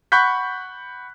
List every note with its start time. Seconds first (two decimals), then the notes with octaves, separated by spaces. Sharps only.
0.12 F#5 B5 C#6 F#6 G6 B6